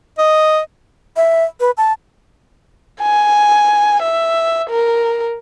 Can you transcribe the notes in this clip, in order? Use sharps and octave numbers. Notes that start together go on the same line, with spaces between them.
D#5
E5
B4
A5
G#5
E5
A#4